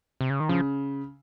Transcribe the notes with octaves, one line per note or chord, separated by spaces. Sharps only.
C3
C#3
D#3
C#3 F3